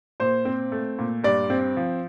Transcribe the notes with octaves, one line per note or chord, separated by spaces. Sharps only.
A#2 C5
C4
A3
A#2
G2 D5
C4
F3